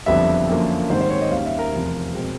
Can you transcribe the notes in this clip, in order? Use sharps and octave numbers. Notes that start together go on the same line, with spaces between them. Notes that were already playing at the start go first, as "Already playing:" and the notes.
F#1 F2 D3 G3 B3 E5
F#2 D3 F3 A#3
G#2 D#3 G3 C4 C5
C5
C#5
D#5
D#2 D#3 G3 A#3 C#4 F5
E5
A#4
F1 E2 C3 F3
B2 G#3 C4